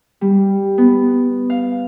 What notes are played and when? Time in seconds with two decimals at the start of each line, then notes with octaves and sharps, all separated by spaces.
0.21 G3
0.78 B3
1.50 F5